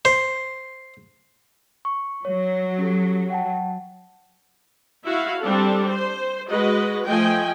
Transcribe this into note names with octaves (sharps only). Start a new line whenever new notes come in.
C5
C#6
F#3 C#5
C#4 G4 A4
F#5 G5 A5
E4 F#4 E5 F5
G3 C4 D4 A4
C5
G#3 F#4 B4 D#5
F3 A3 D#5 G5 G#5